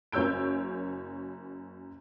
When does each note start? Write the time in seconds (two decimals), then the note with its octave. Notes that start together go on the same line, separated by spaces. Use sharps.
0.12 F#1 F#2 C#5 E6 G6 D7